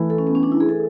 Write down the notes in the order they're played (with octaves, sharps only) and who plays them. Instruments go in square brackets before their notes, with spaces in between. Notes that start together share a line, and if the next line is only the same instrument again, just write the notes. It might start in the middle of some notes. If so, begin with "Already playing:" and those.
Already playing: [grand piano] E3 A3 E4
[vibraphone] A4
C#4
B3
C#4
D4
E4
G#4
A4